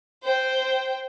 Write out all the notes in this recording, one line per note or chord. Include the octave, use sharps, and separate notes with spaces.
C5 G5